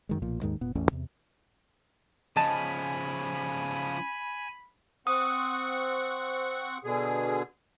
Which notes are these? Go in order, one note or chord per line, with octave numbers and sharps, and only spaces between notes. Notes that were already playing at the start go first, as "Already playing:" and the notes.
F#2 D#3 G#3
B1 A#2 F3
D#2 G#2 D#3 G#3
E1 A#2 B3
A1 E2 A3 C#4
E2 C3
C#3 F3 D#5 G#5 A5 B5
C4 F#5 C#6 D#6
B2 D3 G#4